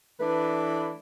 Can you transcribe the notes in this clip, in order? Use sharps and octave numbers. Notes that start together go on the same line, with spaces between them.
E3 A3 D4 B4